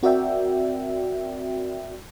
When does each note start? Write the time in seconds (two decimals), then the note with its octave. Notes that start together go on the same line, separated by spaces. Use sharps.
0.03 C4 F#4 A#4 D5 E5 G5